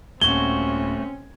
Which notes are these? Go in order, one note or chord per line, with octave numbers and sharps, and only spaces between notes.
D#1 A#2 A3 C4 C#4 F#4 G#6 G7